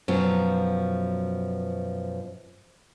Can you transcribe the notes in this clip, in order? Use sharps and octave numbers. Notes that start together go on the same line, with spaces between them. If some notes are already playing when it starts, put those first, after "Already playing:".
F#2 B2 F3